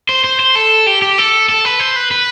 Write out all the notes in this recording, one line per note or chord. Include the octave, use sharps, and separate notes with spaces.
C5
C5
C5
A4
G4
G4
A4
A4
B4
C5
B4
B4